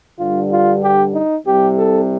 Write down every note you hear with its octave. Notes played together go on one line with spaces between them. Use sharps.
G2 D3 G3 F4
F4
G4
D#4
C2 C3 G3 G4
A4